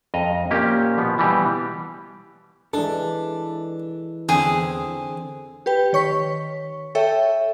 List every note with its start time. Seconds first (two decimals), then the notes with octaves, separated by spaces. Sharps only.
0.14 F2 D#5 A#5
0.51 A#2 A#3 C4 C#4 G4
0.98 B2 F3 B3
1.18 B2 E3 G3 G4
2.73 E3 G#3 D4 A4
4.29 E2 D3 C4 G#4
5.66 G4 B4 G5
5.93 D#3 C#5 C#6 B6
6.95 A4 C#5 E5 G5